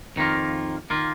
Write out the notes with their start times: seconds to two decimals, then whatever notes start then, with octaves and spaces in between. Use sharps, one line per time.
0.16 F2 D#3 A#3 F4
0.90 D#3 A#3 F4